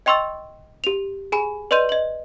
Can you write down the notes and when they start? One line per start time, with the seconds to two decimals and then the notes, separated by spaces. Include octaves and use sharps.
0.06 D#5 G5 C6 C#6 E6 A6
0.84 G4 F7
1.32 G#4 G#5 B5
1.71 B4 D5 D#5 C6 G6 D#7
1.89 D#5 F#7